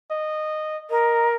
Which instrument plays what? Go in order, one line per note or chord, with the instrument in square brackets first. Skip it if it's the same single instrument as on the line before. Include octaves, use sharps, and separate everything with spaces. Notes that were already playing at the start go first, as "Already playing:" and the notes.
[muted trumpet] D#5
[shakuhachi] A#4 [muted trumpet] D#5